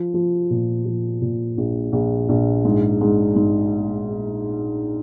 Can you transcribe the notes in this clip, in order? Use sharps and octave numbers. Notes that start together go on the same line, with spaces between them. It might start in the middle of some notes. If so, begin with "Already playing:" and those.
Already playing: F3
F3
A#2
F3
A#2
A#1
A#1
A#1
G#2
G#2
G#2